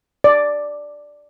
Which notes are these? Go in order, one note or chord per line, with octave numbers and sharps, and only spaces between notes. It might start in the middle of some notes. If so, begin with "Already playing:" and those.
D5